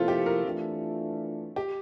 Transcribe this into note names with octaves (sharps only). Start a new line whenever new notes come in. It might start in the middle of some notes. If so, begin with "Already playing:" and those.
Already playing: C3 F3 A3 A#3 C4 E4 F4 A4
G4
A#4
E3 A3 D4 F4
G4